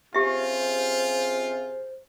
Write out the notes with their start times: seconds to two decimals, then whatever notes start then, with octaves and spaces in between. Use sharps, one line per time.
0.14 C3 C#4 F4 G4 G#4 C5 E5